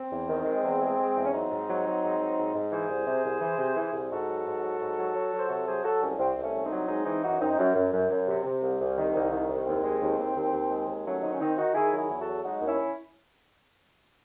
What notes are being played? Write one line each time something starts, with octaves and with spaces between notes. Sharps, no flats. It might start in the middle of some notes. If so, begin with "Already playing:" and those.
Already playing: C4
E2
D#3
G#3
E2
G#3
G#3
E2
C#4
F#3 C4 D#4
G#2
F#3
F#3
G#2
F#3
G#2
G#2
E3 G#4 C5
C2
C3
C2
E3
C3
E3
C2
G#2 F#4 A4
F#3
G#2
F#3
G#2
F#3
F#3
F#3
C5
C3 F#4 A4
F#3 G#4 C5
F#3 F#4 A4
C2 A3 C#4
C2 C4
C2
A3 C#4
C2
C4 D#4
F#3
G#3 C4 D#4
E3 C4 D#4
F#2 D#4 F#4
F#2 C4 D#4
F#2
F#2
F#2
F#2
C3
C3
C2
C2
D#3
C2
D#3
C2
D#2 C4
G#3
D#2
D#2
D#2
D#2
G#3
D#2
F#3 A3 C#4
D#3 C4 D#4
C#4
D#3 C4 D#4
D#3 D#4 F#4
D#3 E4 G#4
F#3
E4 G#4
E2
F#4 A4
F#3
G#3 D#4 F#4
D#2
C#4 E4